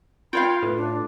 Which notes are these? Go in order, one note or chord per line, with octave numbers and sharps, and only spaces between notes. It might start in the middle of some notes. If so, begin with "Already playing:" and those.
F4 C#5 F5 G5 B5
A2 B4
D4